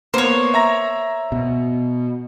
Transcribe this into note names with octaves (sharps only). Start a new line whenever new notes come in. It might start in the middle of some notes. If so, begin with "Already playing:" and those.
A#3 B3 C5 C#5
E5 A#5 A#6
B2